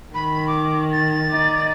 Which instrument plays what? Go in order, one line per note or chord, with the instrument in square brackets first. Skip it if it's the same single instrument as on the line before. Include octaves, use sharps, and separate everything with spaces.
[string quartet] D#3 [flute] B5
[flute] D6
A6
[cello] D#4 D5